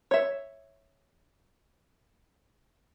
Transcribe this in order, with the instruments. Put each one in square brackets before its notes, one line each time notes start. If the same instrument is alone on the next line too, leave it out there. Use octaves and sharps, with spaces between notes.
[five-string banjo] C#5 E5